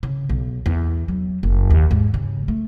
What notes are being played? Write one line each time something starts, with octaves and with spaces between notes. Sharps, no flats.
C#3
B1
E2
F#3
F#1
D#2
G#2
C#3
A3